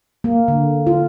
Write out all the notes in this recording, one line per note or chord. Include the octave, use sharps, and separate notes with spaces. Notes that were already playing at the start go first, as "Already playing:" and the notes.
A#3
D3
F4